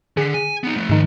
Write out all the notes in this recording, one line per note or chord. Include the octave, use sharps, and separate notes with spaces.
D3 G#4 B6
G#5
B3 D#4
F3 A3
G#2 D#3